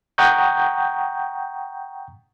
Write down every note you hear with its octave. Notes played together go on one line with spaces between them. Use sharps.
F#5 G5 A#5 C#6 D#6 G6